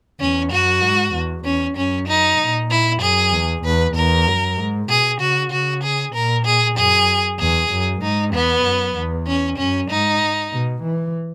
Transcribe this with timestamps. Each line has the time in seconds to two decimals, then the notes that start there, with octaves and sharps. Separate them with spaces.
0.20 E2 C#4
0.51 F#2 F#4
0.82 G#2
1.14 E2
1.44 E2 C#4
1.76 F#2 C#4
2.07 D#4
2.39 A#2
2.70 E4
3.01 F#2 G#4
3.32 E2
3.64 E2 B4
3.95 E2 A#4
4.27 F#2
4.58 G#2
4.89 B2 G#4
5.20 C#3 F#4
5.52 C#3 F#4
5.83 G#4
6.14 A#2 A#4
6.45 G#4
6.77 F#2 G#4
7.39 E2 G#4
7.71 F#2
8.02 G#2 D#4
8.33 E2 B3
8.64 F#2
8.96 E2
9.27 C#4
9.58 F#2 C#4
9.90 G#2 D#4
10.52 B2
10.83 E3